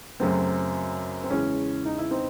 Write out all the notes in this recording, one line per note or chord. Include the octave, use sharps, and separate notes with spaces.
F#2 C#3 F#3 A3 C4
C4
E2 C#3 G#3 C#4
D#4
E4
C4 D#4